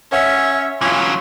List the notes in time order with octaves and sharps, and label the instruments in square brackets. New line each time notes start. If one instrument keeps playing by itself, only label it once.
[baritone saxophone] C#4 [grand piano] C#5 F#5 [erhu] E5
[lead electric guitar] E3 F#3 [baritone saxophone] C#4 [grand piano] F4 F5 [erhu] C6